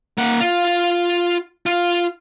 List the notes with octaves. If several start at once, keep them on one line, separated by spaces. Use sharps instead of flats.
A#3 F#5
F4
F4